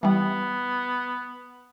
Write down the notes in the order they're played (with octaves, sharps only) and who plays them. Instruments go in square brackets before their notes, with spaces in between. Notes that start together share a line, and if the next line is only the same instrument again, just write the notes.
[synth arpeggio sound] E3 G3 [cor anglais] B3